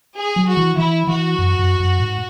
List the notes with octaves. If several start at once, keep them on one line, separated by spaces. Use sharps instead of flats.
G#4
F#3
F#4
E3
E3 E4
E3 F#4
F#2
F#2
F#2
G#2